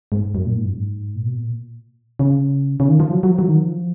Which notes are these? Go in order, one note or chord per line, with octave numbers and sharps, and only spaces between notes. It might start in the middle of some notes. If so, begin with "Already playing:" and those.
G#2
F#2
A#2
G#2
F#2
G#2
A#2
B2
A#2
C#3
C#3
D#3
F3
F#3
F#3
F3
F#3
D#3
F3